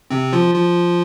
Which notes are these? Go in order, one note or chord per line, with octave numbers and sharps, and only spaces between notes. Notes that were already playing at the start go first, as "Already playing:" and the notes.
C3 C4
F3 F4
F3 F4